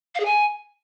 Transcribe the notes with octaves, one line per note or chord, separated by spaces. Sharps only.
F5
G#4
G#5